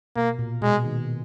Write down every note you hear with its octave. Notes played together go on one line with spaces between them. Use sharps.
B2 A#3
A#2
B2 G#3
D#3